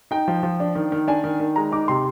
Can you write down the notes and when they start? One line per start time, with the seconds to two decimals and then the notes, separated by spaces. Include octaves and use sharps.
0.11 D#4 G5
0.28 F3
0.43 F3
0.60 D4
0.75 D#3
0.92 D#3
1.08 D4 G#5
1.24 D#3
1.40 D#3
1.56 G#3 A#5
1.72 D#4 D6
1.88 C3 C6